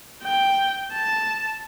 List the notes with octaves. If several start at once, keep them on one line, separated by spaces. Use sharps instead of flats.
G5
A5